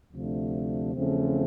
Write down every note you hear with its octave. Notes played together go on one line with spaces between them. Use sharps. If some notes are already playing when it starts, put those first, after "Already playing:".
D2 C3 F3 A3 D4
E2 C#3 F3 A3 C4